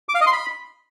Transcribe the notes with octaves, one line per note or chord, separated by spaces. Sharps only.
D6
F5
D#5
C6
B5